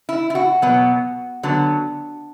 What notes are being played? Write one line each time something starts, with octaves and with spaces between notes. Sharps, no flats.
E4
E4
F#4
B2 F#3 B3
D3 F#3 B3